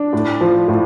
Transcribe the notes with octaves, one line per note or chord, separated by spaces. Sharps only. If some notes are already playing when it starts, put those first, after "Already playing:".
Already playing: D4
A2
F3
A2